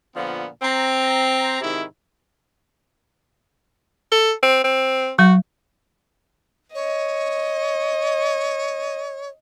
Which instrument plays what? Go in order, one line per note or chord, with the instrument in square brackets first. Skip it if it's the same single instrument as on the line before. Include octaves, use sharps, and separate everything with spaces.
[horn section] A#2 D3 F3 B3
C4 A#5
G#2 C3 D#3 E4
[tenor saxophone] A4
C4
C4
[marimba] F#3 [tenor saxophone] F#4
[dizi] C#5 [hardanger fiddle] D#5